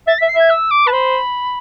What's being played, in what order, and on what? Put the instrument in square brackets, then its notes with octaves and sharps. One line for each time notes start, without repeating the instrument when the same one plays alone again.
[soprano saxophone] E5 [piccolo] A6
[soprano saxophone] E5 [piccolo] B6
[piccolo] C7
[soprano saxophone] E5 [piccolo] G#6
[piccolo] E6
D6
[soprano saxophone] B4 [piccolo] A5
[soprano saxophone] C5 [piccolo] B5